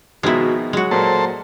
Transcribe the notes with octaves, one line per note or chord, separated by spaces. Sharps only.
B2 D#3 F3 G#3 E4 F#4
F#3 G#3 F#4
A#2 A#3 A4 C5